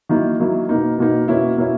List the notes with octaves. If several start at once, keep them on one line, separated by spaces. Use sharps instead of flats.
D#3 F#3 A#3 E4
D#3 F#3 A#3 E4
B2 A#3 D#4
B2 A#3 D#4
B2 A#3 C#4 E4
B2 A#3 C#4 E4